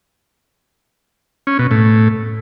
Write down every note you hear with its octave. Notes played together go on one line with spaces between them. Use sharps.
C#4
B2
A2